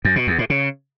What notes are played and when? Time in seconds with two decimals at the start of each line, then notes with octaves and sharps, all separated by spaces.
0.05 F#2
0.16 B2
0.27 E2
0.38 A2
0.50 C#3